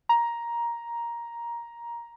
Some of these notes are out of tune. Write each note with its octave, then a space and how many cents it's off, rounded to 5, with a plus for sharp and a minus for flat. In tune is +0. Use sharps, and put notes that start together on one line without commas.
A#5 +10